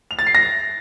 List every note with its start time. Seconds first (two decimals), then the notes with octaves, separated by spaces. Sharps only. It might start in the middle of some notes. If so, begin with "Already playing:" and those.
0.11 F7
0.19 A6
0.27 C7
0.35 A#6